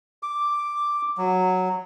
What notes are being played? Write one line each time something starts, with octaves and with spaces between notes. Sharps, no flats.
D6
F#3